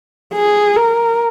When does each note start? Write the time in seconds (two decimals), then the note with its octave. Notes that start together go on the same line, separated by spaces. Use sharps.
0.34 G#4
0.76 A#4